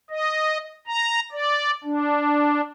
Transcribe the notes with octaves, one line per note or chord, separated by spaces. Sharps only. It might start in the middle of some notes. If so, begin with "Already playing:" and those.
D#5
A#5
D5
D4